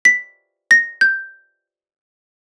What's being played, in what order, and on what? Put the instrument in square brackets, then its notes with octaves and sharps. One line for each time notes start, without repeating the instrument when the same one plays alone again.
[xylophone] B6
A#6
G6